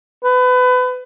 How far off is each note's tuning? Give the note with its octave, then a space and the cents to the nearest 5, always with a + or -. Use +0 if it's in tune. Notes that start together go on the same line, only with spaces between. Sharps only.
B4 +30